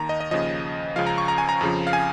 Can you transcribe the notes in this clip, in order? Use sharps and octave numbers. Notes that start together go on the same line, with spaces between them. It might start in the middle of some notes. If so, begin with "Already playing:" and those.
Already playing: D#2 D#3 A#5
D#5
D#5
D#2 C#3 F3 D#5
C#2 C#3 F3 F5
A#5
C#6
A#5
G#5
A#5
F2 C#3 F3
F5
G#5